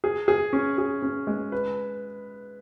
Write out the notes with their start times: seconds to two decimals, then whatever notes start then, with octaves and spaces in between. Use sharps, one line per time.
0.04 G#4
0.28 G#4
0.53 C#4
0.78 G#4
1.02 C#4
1.27 G#3
1.52 B4